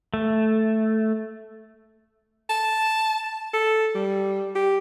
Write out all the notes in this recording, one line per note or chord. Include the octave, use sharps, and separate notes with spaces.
A3
A5
A4
G3
G4